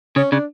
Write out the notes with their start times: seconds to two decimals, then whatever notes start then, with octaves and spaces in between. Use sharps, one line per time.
0.16 C#3 C#4
0.32 C#3 D4